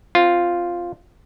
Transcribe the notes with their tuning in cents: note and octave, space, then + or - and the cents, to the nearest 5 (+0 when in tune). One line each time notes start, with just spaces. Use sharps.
C4 +0 F4 +0